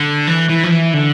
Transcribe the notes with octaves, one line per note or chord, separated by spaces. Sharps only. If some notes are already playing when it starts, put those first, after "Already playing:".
Already playing: D3
E3
E3
F3
E3
D3